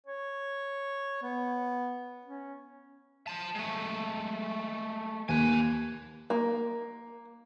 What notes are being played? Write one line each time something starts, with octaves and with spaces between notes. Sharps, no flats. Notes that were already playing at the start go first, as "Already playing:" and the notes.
C#5
B3
C#4
C5 A5
G#3 A3
D#2 B4 G#5
A#3